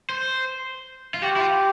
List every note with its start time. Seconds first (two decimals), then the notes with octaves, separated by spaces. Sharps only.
0.10 C5
1.14 F4
1.22 F#4 G4
1.36 E4
1.40 F4